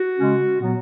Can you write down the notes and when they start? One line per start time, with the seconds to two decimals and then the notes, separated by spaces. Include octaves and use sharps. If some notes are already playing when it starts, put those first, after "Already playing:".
Already playing: F#4
0.18 C#3 G#3 C#4
0.58 A#2 F#3 B3